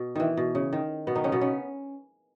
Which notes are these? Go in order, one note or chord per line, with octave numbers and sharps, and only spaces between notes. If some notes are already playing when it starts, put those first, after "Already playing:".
Already playing: B2
D#3 E3
B2
C#3
D#3
B2 B3
D#3 D#4
C#3 C#4
B2 B3
C#3 C#4